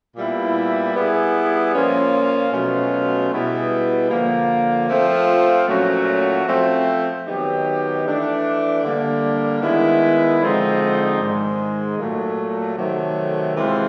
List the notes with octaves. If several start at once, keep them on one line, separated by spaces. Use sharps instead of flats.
A#2 G3 B3 E4
G3 B3 E4 G#4
A#2 F3 A#3 C#4 F4
B2 F#3 A3 C#4 F4
B2 G3 B3 E4 G#4
D3 F3 A#3
F3 A3 C4 F4
A#2 F#3 A3 C#4 F#4
F3 A3 C4
D#3 F#3 B3 D#4 G4
E3 A3 D4
D3 G3 A#3 D4
D#3 G#3 B3 E4
D3 F3 G#3 C4 D#4
G#2 D#3 G#3
A#2 F#3 A3
C3 D#3 F#3 A3
C3 E3 G#3 C4 F4